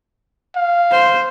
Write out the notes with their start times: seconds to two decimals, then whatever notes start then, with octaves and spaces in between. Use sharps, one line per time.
0.56 F5
0.92 C5